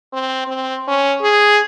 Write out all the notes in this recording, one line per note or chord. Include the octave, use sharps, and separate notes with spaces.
C4
C4
C#4
G#4